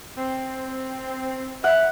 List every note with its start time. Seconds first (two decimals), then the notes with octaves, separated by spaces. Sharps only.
0.17 C4
1.64 E5 F#5